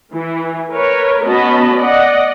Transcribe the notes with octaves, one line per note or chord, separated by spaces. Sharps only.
E3
A#4 B4 C#5
B3 C#4 F#4 D#5 A5 B5
D5 D#5 F#5